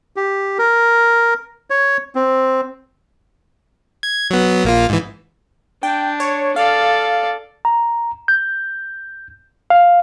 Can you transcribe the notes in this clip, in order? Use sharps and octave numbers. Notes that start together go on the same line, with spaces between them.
G4
A#4
C#5
C4
G#6
F#3 B3
A#1 A#3 F4
G#2 E3
D4 G5
C#5
A4 D5 F5
A#5
G6
F5